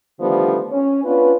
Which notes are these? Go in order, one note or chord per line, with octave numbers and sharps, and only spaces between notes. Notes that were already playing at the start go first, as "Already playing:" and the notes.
D3 D#3 F3 G3 A3 B3
C#4
B3 C#4 D4 F4 B4